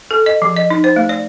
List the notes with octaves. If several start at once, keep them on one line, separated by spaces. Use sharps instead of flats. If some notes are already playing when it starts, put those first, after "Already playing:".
A4
D#5
F3
D#5
D#4
C5
A3
D5